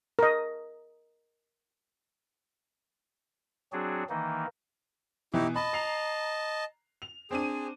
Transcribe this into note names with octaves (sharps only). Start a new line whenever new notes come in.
A#4 D#5
F#3 C4 D4 F#4 G#4
D#3 E3 A#3 D#4
B2 E3 D#4 E4 G4
D#5 A5 B5
A#5 C7 F7
F7
C4 D4 G#4 D#7